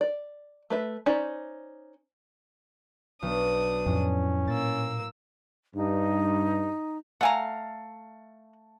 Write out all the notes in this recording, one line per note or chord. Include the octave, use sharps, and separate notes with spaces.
D5
A3 B4 E5
C#4 D#4 C5 D5
B1 D4 D#6
F2 A2 C#4
A#2 A#3 E6 A6
G2 D#4
A3 F5 F#5 G#5 A#5